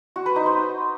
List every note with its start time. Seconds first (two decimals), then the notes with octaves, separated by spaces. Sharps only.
0.16 F#4
0.26 B4
0.36 D#4
0.46 C5